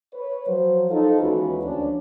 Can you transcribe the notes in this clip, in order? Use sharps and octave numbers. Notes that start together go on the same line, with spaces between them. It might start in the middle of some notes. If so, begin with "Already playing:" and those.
B4 C#5
F3 F#3 C5
D#4 F4 A4
D#2 E3 G#3 C#4 F#4 B4
D2 F3 C#4 D4